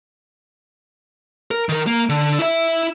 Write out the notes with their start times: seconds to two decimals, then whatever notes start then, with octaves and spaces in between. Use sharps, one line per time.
1.51 A#4
1.69 D#3 A#4
1.87 A#3
2.09 D3
2.39 E4 E5